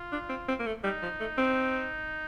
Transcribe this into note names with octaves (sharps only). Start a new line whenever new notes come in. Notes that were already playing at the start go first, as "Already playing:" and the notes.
Already playing: F4
D4
C4
C4
A#3
A3
G3 D#4
F3
A3
C4